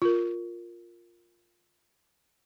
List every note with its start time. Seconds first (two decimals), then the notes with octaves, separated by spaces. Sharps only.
0.02 F4 A#4